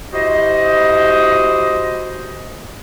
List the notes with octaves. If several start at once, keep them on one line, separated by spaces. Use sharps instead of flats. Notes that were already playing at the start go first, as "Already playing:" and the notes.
E4 F#4 G4 C5 D#5